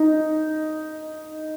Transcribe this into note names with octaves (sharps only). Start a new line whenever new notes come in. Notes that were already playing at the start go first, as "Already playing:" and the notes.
Already playing: D#4